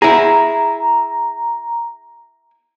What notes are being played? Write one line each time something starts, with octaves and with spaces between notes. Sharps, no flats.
E4 G#4 A#5